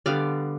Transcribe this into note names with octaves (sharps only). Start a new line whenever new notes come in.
D3 G3 B3 D5 F5